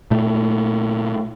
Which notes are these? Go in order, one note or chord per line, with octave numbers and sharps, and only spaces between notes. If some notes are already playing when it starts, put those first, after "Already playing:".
A#2 A3